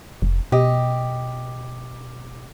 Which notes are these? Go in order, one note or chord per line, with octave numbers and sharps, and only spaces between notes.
F1
B2 G4 D#5